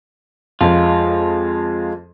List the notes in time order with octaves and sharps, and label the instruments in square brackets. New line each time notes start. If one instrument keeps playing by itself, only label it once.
[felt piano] F2 [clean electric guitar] G#3 F4